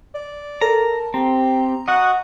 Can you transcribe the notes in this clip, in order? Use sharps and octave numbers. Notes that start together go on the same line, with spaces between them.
D5
A4 A#4 A5 A#5
C4 G4 A#5
F#4 D#5 F#5